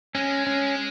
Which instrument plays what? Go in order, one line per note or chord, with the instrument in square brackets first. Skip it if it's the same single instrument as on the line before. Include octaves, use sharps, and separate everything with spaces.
[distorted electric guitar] G#3 [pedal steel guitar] C#4
[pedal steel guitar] C#4